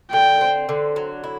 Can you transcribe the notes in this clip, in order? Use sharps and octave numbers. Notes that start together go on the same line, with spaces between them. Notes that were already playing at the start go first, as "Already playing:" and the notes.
D3 G5
C4
D3
F#3
E4